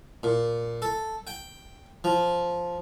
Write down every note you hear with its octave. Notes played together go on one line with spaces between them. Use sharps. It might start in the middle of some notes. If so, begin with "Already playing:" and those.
A#2
A4
G5
F3